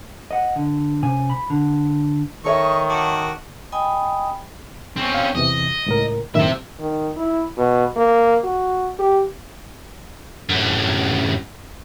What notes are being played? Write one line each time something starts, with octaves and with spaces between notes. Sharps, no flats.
D#5 F#5
D3
C3 C#4 G#5
B5
D3
D#3 A4 C#5 D#5 E5 C#6
F#4 A5 D6
D#5 G5 G#5 B5 D#6
C4 C#4
F5
E2 C3 E3 D#5
C#2 A2 A#4
F#2 A2 D#3 C4 E5
D#3
E4
B2
A#3
F#4
G4
F#2 A2